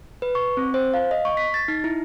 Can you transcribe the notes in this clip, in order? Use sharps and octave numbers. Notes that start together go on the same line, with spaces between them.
B4
C#6
C4
C5
F5
D#5
C#6
B6
A6
D#4
E4